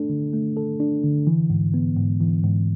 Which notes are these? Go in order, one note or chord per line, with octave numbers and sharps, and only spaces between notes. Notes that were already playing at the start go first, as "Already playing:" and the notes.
Already playing: A3 D4 A4
D3
A3
A4
D4
D3
E3
G#2
B3
G#2
E3
G#2